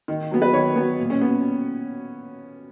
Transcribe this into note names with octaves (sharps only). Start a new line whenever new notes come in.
D#3
F#3 B3
B4
D#3 C#5
F#3 B3
A#2
C#4
B3